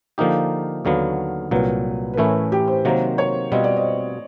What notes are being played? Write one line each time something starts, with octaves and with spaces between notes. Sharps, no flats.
D3 F3 A#3 D#4 G4 F5
D#2 D3 F#3 B3 F5
C2 A#2 F#3 B4
B4
A2 E3 A3 C#4 E4 A#4
G4
C5
C3 D#3 F#3 A#3 C5
C#5
B2 G3 C4 F4 D#5
D5
D#5